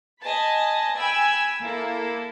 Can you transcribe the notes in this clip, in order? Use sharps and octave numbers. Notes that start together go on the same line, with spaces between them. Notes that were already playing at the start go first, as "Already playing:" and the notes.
D#5 G#5 A5 B5
G5 G#5 B5 E6 G#6
A#3 E4 A4